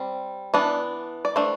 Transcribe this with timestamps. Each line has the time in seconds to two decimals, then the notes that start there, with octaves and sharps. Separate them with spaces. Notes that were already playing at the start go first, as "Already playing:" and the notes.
Already playing: G3 C4
0.54 E3 B3 D4
1.25 D5
1.36 E3 A3 D4 C5